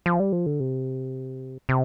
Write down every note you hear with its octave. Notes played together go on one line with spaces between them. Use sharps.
F3
G3
F3
D3
C3
C3